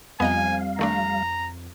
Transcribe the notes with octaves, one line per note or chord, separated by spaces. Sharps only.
F2 G3 B3 D#5 F5 G#5 A#5
D#3 A3 D4 A#5